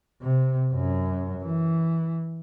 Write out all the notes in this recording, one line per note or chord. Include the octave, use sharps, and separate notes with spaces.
C3
F#2
E3